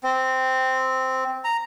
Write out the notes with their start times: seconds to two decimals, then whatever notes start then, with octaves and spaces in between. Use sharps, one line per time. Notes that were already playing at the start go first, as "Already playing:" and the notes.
0.03 C4
1.44 A#5